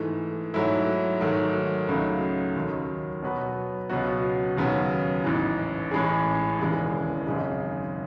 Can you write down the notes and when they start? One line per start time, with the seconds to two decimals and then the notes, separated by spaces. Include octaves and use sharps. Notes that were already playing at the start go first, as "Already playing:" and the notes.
Already playing: G#2 E3 A3
0.54 G#2 F#3 A3 E4
1.21 G#2 D#3 F#3 A3
1.88 C#2 C#3 F#3 A3 D#4
2.56 D#2 D#3 F#3
3.22 B2 F#3 B3 F#4 B4
3.90 C#2 B2 F#3 B3 F#4
4.57 D#2 C#3 F#3 B3
5.24 A1 G#2 E3
5.91 A1 A2 G#3 C#4 G#4
6.59 E1 D#2 C#3 E3 G#3
7.26 G#1 F#2 C#3 G#3 D#4